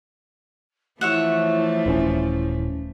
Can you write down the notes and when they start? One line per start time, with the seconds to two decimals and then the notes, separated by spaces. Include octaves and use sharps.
1.01 E3 F3 A3 E4 C#5 E5 F#5
1.86 D#1 C4 C#4